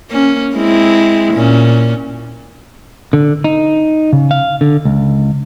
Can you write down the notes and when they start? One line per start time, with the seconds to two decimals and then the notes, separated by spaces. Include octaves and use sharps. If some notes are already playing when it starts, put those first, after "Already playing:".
0.10 A#3 C#4
0.56 G#3 C4 E4
1.34 A#2 C#4
3.13 D3
3.44 D#4
4.13 C#3
4.31 F5
4.61 D3
4.85 C#2